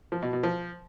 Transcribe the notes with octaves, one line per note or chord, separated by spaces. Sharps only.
F3
B2
B2
F3